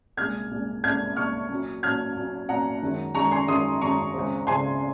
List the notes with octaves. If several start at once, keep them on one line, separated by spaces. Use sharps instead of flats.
C2 A#2 G#3 F6 G#6
C2 A#2 G#3
C2 A#2 G#3 F6 G#6
C2 A#2 G#3 C#6 F6
A#2 F#3 C#4
A#2 F#3 C#4 F6 G#6
A#2 F#3 C#4
A#2 F#3 C#4 F#5 A#5
F#2 D#3 G#3
F#2 D#3 G#3 A#5 C#6
G#5 C6
F#2 D#3 G#3 C6 D#6
F#2 D#3 G#3 A#5 C#6
C#2 C#3 G#3 C4
C#2 C#3 G#3 C4 G#5 C6